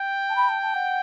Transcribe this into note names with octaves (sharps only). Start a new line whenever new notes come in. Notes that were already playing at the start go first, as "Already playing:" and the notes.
Already playing: G5
A5
B5
A5
A5
F#5